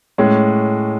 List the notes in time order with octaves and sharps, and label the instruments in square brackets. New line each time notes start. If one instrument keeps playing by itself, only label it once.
[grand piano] A2 G#3 C#4